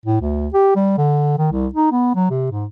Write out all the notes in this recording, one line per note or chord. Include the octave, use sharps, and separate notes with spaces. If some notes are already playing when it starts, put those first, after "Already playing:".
A2
D2
G4
G3
D3
D#3
C2
D#4
B3
F#3
C3
G#2